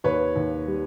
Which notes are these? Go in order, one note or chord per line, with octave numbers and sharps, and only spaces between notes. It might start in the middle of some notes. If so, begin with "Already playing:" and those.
D#2 B4 C#5
D#2
G3